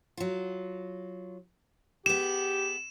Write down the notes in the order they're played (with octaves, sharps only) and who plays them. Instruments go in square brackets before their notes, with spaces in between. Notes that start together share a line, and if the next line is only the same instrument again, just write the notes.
[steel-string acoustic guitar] F#3 F4
[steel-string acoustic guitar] B3 G#4 [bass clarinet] G4 [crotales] E7